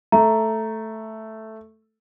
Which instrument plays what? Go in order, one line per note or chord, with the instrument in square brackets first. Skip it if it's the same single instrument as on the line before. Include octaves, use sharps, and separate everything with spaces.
[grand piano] A3 [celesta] A#5